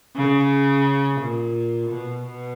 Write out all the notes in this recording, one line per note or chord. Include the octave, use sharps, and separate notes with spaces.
C#3
A#2
B2
B2